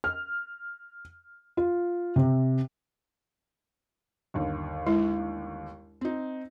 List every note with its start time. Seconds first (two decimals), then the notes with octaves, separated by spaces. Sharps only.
0.04 F6
1.57 F4
2.16 C3
4.34 G1 D#2
4.87 G#3 E4
6.01 C4 D#4